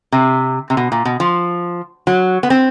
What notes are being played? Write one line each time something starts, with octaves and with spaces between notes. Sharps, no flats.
C3
C3
B2
A#2
B2
F3
F#3
B3
C4